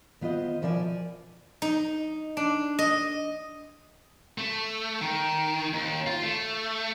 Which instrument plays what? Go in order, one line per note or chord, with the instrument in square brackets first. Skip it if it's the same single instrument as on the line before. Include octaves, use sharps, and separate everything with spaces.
[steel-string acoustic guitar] D#3 B3 F4 C5 D#5
B2 F3 A#4 D5 E5 G#5
[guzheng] D#4
D4
D#5
[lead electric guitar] A3
D#3
D#2
F4
A3